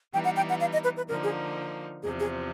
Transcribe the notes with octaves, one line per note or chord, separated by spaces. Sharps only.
E3 G3 B3 D#4 G5
F#5
G5
F#5
F5
D#5
B4
B4
D3 F3 A#3 D#4 A#4
G#4
E2 C3 F3 G#4
G#4